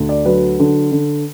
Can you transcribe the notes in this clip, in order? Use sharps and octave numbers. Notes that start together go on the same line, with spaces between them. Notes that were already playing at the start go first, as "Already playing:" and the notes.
Already playing: D2
D5
F#3 B4
D3
D3